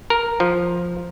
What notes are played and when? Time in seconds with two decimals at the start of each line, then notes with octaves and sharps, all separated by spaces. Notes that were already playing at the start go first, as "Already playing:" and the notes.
0.10 A#4
0.40 F3